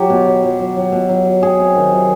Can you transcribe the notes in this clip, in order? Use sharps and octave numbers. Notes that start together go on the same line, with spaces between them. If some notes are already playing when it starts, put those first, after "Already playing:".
Already playing: F#3 G4
B2
F#3
F#3
F#3
F#3
B2
F#3
F#3
F#3 G#4
C3
D#3
F#3